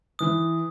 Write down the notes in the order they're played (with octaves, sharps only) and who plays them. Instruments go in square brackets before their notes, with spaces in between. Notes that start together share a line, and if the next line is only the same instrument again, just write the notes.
[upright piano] E3 [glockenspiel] D#6